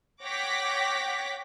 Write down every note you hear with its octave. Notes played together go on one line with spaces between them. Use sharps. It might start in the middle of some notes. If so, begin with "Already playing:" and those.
C#5 F#5 G5 D6 A#6 B6